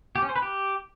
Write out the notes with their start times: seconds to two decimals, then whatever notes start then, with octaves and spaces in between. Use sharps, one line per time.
0.16 G4
0.22 C#4
0.29 C5
0.36 B4
0.42 G4